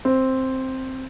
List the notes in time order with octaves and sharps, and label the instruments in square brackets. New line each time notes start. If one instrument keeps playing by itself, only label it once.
[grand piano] C4